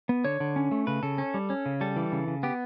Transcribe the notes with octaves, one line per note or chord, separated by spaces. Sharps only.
B3
D3 C#5
D3
C#4
A3
C#3 B4
C#3 A4
C#4
G3
C#4
C#3
G3 A4
E3
C#3
C#3
B3 G4